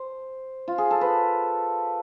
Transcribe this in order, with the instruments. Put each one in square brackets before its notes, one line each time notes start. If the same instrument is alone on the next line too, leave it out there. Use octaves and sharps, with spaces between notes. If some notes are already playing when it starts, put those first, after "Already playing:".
Already playing: [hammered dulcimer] C5
F4
G#4
A4
B4